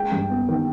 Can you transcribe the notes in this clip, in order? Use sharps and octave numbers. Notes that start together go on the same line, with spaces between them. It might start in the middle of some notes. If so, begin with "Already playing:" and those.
Already playing: G#3 G5
G2
B3
D#3